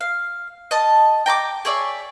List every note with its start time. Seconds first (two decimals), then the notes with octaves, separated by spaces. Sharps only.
0.01 F5
0.71 D#5 A5
1.26 G5 A#5 C#6 D6
1.65 G#4 C#5 D5 E5